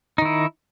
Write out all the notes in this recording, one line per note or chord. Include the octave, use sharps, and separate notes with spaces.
D#3 D#4 E4